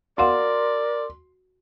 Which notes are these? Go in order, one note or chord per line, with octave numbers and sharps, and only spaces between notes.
F#4 A#4 D5 F5 F#5 C6